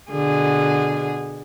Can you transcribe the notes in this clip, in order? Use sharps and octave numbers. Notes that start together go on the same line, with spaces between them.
B2 D3 G#4